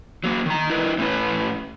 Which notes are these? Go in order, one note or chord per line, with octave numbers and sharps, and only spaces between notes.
F#3 A#3
D#3 A#5
E4 A#4 B4 D#5
A2 C#4 B4